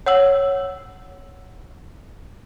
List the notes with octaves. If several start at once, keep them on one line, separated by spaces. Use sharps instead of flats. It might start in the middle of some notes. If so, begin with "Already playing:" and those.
C#5 F#5 E6 F#7